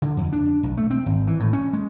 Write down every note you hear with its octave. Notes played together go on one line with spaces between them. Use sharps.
D3
F2
D4
B1
A3
C4
G#1
E3
A2
C#4
G#3